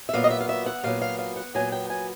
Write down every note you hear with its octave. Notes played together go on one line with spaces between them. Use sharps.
E5
A#2 F#3 B3 F5
D#5
E5
F5
E5
F#5
A#2 F#3 B3 F5
F5
F5
F#5
A#2 F#3 B3 G#5
G5
G#5